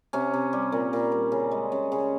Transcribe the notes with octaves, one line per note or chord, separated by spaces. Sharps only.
C3 C#4
C3
G3
A#2
A#2
G3
C#3
G#3
C#3
C#3